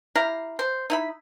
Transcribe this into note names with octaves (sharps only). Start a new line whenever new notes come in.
E4 G4 F5 A#5
C5
D#4 E4 B5